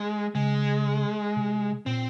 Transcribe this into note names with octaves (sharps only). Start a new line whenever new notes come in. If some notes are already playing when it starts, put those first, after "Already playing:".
Already playing: G#3
C#3 G#3
C3
A#2 C4